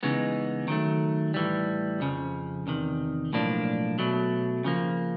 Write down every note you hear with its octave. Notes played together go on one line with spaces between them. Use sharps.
C#3 E3 G#3 B3 D#4
D#3 F#3 A3
A2 E3 G3
F2 C#3 F3
E2 C3 D#3
B1 A2 F3 A#3 D4
B1 B2 F#3 A3
C#3 F3 A#3